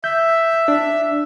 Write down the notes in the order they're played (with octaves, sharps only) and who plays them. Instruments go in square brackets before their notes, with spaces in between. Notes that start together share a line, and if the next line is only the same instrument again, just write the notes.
[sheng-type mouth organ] E5 [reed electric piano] G6
[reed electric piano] D4